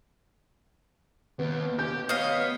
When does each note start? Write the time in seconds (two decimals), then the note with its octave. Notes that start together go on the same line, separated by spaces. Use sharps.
1.39 D#2 B3
1.79 G4 G6
2.09 B3 C#5 D#5 F5